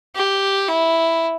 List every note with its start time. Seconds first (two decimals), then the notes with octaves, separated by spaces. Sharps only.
0.16 G4
0.69 E4